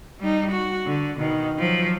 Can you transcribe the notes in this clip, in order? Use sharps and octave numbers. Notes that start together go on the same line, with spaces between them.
G3 D#4
F#4
D3
B2 D#3
F3 F#3